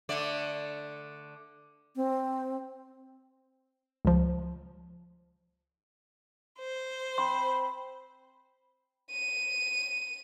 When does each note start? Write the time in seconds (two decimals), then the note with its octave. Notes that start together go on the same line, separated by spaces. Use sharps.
0.09 D3 A3 D5
1.96 C4
4.05 C#2 F3
6.59 C5
7.18 C4 B5 C6
9.12 D#7